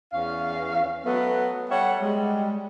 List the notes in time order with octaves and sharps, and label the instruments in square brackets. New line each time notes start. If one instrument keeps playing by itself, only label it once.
[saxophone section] E2 C#4 F5
F#3 A3 B3
G3 A4 C#5 E5 F#5
G3 G#3